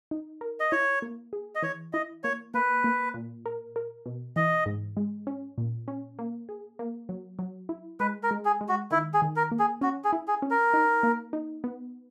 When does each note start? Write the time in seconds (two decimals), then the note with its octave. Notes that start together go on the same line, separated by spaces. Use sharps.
0.11 D#4
0.41 A#4
0.60 D#5
0.72 E4 C#5
1.02 A#3
1.33 G#4
1.55 D#5
1.62 E3 C#5
1.93 E4 D#5
2.24 A#3 C#5
2.54 A#3 B4
2.84 A#3
3.14 A#2
3.46 A#4
3.76 A#4
4.06 B2
4.36 E3 D#5
4.66 G#2
4.97 G#3
5.27 C#4
5.58 A#2
5.88 C#4
6.19 A#3
6.49 G#4
6.79 A#3
7.09 F#3
7.39 F#3
7.69 E4
8.00 G#3 B4
8.23 A#4
8.31 G#3
8.45 G#4
8.61 G#3
8.69 F#4
8.91 D#3 E4
9.14 G#4
9.22 D#3
9.36 A#4
9.51 A#3
9.59 G#4
9.81 C#4 F#4
10.04 G#4
10.13 E4
10.28 G#4
10.42 C#4
10.50 A#4
10.74 D#4
11.03 A#3
11.33 D#4
11.64 B3